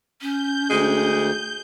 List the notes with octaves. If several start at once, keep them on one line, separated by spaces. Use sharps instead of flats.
C#4 G6
D2 G#3